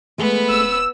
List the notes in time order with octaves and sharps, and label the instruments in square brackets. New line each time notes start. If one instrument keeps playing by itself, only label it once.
[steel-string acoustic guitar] G#3 A3 [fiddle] B3 B5
[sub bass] D1 [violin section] E6